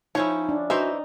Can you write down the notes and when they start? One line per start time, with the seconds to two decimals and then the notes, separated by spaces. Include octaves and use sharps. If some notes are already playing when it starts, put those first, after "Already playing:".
0.15 F3 C#4 D#4 E4 C#5
0.49 D4
0.70 E3 D#4 F#4 C5 E5